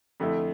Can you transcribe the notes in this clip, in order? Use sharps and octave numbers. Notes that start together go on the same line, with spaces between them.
F2 D3 A3 E4